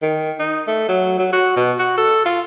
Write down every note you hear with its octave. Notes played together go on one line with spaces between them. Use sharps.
D#3
D#4
A3
F#3
F#3
F#4
B2
F#4
A4
F4